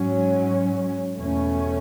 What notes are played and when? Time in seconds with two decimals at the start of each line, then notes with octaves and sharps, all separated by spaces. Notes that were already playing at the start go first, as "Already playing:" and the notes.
Already playing: G#2 F#3 C#4
1.15 E2 B2 A3 C#4